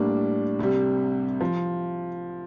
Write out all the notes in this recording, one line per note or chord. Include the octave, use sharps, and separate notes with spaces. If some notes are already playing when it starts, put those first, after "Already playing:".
Already playing: A2 G3 A#3 D4
C2 C3 G3
F3